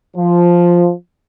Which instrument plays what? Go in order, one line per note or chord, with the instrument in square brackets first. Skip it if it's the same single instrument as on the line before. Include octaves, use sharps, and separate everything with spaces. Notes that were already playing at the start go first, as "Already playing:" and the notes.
[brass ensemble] F3